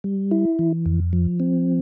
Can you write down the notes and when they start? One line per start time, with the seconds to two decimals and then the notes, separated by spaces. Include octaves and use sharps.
0.04 G3
0.31 E4
0.59 E3
0.86 F2
1.13 F3
1.40 C4